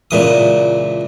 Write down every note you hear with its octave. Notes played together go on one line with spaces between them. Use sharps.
C#2 A#2 E3 D#6